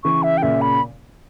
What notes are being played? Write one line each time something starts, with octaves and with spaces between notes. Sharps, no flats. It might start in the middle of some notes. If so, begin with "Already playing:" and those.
C#3 E3 C#6
E5
G5
A#2 C#3 E5
B5